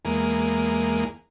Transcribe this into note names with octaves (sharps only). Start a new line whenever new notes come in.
E2 G#3 A#3